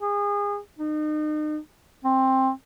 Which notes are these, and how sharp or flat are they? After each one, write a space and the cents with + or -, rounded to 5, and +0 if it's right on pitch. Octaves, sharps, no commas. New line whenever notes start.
G#4 -30
D#4 -35
C4 +15